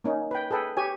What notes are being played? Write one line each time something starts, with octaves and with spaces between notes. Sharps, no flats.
A#3 C#4 D#4
B4 G5
G#4 A4 B4 G5
G4 C#5 G#5